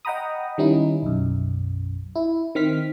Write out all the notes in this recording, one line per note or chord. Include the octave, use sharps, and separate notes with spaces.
D#5 F#5 G5 A#5 B5 D#6
D#3 G3 C#4 D#4 E4
B1 F#2
E4
D#3 C4 F6 B6